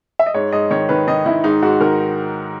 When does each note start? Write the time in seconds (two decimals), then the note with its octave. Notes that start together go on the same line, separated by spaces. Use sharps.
0.19 E5
0.26 D#5
0.34 G#2 C#5
0.52 G#2 D#5
0.71 D#3 C#5
0.89 D#3 B4
1.07 D#3 D#5
1.26 D#3 E4
1.44 G#2 D#4
1.62 G#2 F#4
1.80 D#3 A#4